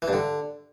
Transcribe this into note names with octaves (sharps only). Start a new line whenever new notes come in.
E3
G2
D3